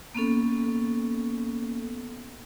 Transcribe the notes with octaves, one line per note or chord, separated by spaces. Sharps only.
A#3 B3 C#4 A4